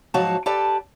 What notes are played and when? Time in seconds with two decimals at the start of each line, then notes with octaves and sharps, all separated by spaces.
0.14 G#2 F3 F#3 F#4 C#5 A5
0.46 G4 A4 B4 D5 A5